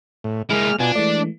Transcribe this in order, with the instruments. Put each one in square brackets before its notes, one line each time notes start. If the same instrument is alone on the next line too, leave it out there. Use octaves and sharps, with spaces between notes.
[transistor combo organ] A2
[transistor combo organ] G#3 F6 [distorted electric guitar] A#3 E4
[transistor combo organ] B2 G#5 [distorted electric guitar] D4 [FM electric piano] F4
[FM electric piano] E3 G#3 A3 [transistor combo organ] D5